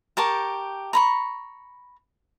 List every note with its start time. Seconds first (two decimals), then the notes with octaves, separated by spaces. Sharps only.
0.17 G4 A#4 A5 C#6
0.93 A#5 B5 C#6